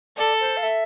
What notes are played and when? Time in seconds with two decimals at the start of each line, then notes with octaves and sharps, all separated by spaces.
0.17 A4 D5
0.40 C5
0.57 F5
0.63 E5